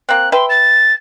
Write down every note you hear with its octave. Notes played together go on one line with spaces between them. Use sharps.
A#3 C4 F#6
B4 E5 G5 C6
A6